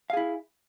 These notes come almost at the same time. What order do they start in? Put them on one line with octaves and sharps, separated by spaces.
F5 G#4 E4